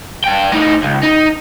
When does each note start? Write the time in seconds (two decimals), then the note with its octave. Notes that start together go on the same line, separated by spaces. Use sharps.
0.24 G2 G5
0.51 A2 D#4
0.83 C#2
1.03 D#4